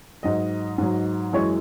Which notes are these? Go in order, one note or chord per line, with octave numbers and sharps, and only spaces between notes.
G#2 F#3 D#5
G#2 F#3
F#2 E3 G#3 C#5